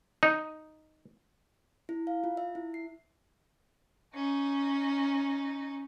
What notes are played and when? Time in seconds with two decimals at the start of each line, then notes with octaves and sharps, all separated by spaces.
0.23 D#4
1.89 E4
2.07 F5
2.24 F4
2.37 E5
2.55 E4
2.74 C7
4.14 C#4 D#4